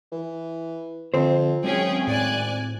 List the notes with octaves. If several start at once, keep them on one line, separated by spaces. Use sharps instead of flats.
E3
F2 D3 C4 C5
G#1 F#3 C#4 G#4 G5
A2 D5 G#5 F#6